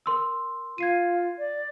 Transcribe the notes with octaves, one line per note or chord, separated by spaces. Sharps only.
A#4 C6 E6
F4 G#6 C7 D#7
D5